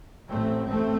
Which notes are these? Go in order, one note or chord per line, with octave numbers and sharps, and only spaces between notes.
A1 A2 A3 C4
A3 C4